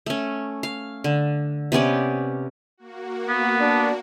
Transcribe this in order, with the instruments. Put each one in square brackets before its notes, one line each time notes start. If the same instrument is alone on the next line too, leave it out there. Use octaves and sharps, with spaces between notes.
[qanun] A3 C#4
F5
D3
C3 B3 C#4 D5
[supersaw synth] A#3 F#4
[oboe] B3
[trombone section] D4